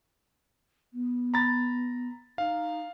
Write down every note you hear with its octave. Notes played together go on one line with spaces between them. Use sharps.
B3
A#5 B5 A6
D#4 F5